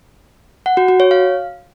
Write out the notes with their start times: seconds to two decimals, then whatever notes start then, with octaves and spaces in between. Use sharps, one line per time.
0.66 F#5
0.77 F#4
0.88 F#4
1.00 C#5
1.11 F5